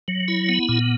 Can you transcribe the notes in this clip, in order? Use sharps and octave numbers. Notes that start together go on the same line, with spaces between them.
F#3
E4
B3
A#2